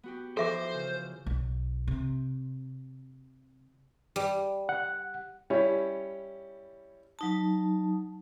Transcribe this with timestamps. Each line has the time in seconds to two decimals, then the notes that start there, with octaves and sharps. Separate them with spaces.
0.03 B3 F#4 G4
0.37 E3 F3 A4 C5 E5 D6
0.74 C#3
1.26 B1
1.87 C3
4.16 G3
4.69 F#5
5.50 G3 C#4 E4 C#5
7.19 F#3 D#4 A5